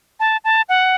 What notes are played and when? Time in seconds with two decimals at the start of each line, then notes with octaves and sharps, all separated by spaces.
0.20 A5
0.44 A5
0.69 F#5